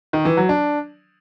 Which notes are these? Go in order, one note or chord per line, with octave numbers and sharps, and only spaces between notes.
D#3
E3
F#3
D4